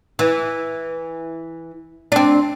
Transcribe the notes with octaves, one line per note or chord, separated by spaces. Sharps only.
E3
C4 D4